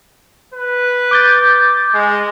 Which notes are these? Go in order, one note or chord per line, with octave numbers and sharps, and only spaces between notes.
B4
D6 G6 A6
G#3